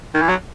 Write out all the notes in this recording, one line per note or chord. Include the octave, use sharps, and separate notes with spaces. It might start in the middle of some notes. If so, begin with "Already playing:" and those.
D#3
E3
F#3